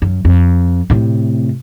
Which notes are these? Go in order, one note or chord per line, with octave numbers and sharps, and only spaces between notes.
F#2
F2
A2 C3